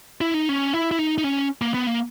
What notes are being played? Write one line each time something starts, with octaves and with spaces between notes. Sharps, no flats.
E4
D#4
C#4
E4
E4
D#4
D#4
C#4
A#3
B3
A#3